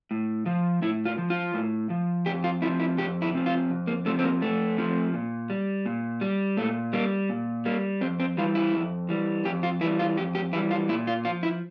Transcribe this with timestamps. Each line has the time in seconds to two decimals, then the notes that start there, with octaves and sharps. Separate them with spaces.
0.11 A2
0.46 F3
0.82 A2 E4
1.05 F4
1.18 F3
1.30 F4
1.54 A2
1.90 F3
2.26 F2 G4
2.44 F4
2.62 C3 E4
2.65 F3
2.80 E4
2.98 F2 G4
3.22 E4
3.34 C3 F3
3.46 F4
3.70 F2
3.87 A#3
4.06 C3 A3
4.09 F3
4.19 C4
4.24 A#3
4.42 F2 A3
4.77 C3 F3
5.14 A#2
5.50 G3
5.86 A#2
6.21 G3
6.57 A#2 A3
6.93 G3 A#3
7.29 A#2
7.65 G3 A#3
8.01 F2 C4
8.20 C4
8.37 E3 G3 F4
8.55 E4
8.73 F2
9.09 E3 G3
9.45 F2 G4
9.63 F4
9.81 E3 E4
9.84 G3
9.99 F4
10.17 F2 G4
10.35 G4
10.53 E3 G3 E4
10.71 F4
10.89 A#2 E4
11.07 F4
11.25 F3 F4
11.43 E4